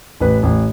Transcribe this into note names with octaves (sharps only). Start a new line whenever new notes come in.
A1 B4
A1